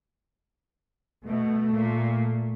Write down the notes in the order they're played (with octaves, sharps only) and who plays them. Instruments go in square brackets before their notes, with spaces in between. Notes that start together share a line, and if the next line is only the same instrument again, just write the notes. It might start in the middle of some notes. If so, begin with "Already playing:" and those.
[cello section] B2 [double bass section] A3
[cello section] A#2